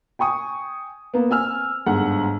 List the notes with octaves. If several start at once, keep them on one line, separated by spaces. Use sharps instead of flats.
G5 G#5 C#6 D#6
A#3 B3
C4 G#5 E6 F6
G1 G#2 F#5